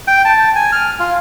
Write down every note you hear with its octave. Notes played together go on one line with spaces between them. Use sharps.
G5
A5
G#5
F6
F4